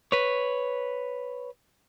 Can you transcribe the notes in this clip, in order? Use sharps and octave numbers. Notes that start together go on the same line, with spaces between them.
B4 C#5